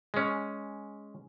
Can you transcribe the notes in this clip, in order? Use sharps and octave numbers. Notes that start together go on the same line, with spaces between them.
G#3 C#4